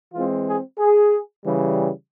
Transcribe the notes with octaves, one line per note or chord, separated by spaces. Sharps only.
E3 G#3 C4 F4
G#4
G#4
C#3 E3 G3